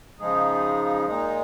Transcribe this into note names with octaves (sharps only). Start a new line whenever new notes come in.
C#3 F3 G#3 D#4 G#4
A#2 G#3 D#4